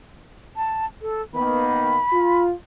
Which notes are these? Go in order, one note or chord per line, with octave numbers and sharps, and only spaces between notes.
A5
A4
D#3 A#3 B3 B5
F4